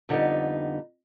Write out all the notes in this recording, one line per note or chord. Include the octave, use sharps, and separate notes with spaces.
F2 D3 G3 B3 D#4